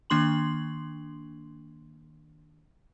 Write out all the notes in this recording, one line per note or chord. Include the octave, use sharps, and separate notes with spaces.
D#3 A#3 D4 C6 F#7